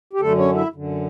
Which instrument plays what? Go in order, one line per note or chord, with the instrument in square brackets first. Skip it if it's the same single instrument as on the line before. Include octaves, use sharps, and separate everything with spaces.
[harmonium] G4
F#2 D3 A3 A4
C#4 C#5
E4 E5
F#2 D3